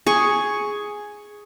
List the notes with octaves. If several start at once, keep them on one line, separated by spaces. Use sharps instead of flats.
G#4 C#6